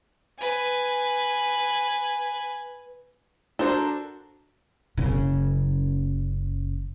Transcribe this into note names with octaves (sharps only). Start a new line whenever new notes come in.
B4 G#5
D4 F#4 A4 A#4 C5
F#1 C#3